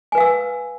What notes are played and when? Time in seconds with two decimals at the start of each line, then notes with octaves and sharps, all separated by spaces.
0.12 G#5
0.15 B4
0.18 F5
0.20 E6